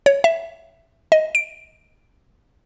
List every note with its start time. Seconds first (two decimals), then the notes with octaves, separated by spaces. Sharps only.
0.06 C#5
0.24 E5
1.12 D#5
1.35 D7